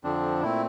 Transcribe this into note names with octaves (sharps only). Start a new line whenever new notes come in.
F2 D3 F3 C4 D4
A#2 A3 C4 E4